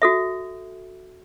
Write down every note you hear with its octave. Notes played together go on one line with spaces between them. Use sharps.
F#4 A4 E5